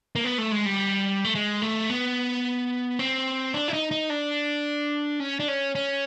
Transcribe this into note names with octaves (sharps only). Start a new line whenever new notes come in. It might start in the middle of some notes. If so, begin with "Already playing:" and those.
A#3
B3
A3
G#3
G3
A3
G#3
A3
B3
C4
D4
E4
D#4
D#4
D4
C#4
D4
C#4
C#4